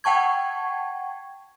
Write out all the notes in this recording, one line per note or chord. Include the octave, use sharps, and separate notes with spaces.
F#5 G5 A5 C#6 G#6